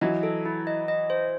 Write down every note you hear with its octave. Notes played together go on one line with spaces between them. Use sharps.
E3 F#3 D#5
A4
E4
D#5
D#5
C5